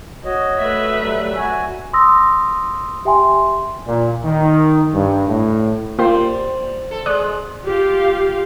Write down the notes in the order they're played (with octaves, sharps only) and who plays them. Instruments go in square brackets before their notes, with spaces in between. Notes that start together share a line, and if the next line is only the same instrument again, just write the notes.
[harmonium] F#4 C#5 D#5
[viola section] A3 B4 E5
[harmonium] F#3 G3
F#4 G#5
[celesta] C6 D#6 E6 A#6
G4 E5 G5 G#5 C6
[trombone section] A#2
D#3
G2
A2
[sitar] G3 C5 [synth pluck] A#3 F4 G4
[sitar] A4
[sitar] G#3 [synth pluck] D5 D#6 F#6
[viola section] F4 G4 F5